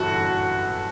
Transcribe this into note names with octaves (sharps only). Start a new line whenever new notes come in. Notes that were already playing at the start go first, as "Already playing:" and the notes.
Already playing: G1 F#2 E3 F#4 A4